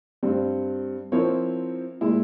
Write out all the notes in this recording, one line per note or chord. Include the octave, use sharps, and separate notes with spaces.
G2 G3 C4
F3 C4 E4 A#4 C#5
A#2 G#3 E4